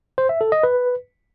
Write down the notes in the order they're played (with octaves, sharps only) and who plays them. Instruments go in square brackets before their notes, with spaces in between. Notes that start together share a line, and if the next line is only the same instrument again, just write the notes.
[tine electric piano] C5
E5
A4
D#5
B4